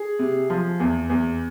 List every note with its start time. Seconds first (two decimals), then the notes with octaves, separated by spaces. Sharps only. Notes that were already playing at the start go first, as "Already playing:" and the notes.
Already playing: G#4
0.19 C3
0.50 F3
0.80 E2
1.10 E2